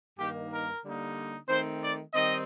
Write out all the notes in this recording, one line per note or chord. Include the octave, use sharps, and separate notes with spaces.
G2 D#3 A#3 D#4 G4
A#4
D3 G3 A#3 D#4
D#3 A3 C4 C5
D5
D#3 G3 C4 D#4 D#5